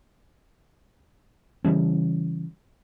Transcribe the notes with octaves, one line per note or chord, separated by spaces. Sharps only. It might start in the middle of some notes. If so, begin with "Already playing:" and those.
C#3 E3 G3 C#4